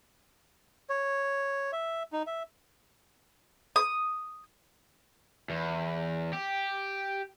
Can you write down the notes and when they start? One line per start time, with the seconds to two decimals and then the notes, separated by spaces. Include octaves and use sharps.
0.90 C#5
1.73 E5
2.13 D#4
2.27 E5
3.76 D#6
5.50 E2
6.33 G4